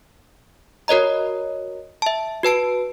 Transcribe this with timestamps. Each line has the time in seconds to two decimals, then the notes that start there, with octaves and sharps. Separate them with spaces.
0.88 F#4 A#4 C#5 D#5 A#5
2.02 E5 A5
2.43 F#4 B4 A5 D7